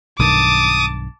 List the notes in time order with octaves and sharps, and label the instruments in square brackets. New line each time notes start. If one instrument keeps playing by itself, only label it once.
[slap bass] B1 G2 D#3 [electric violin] A5 D6 [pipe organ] D#6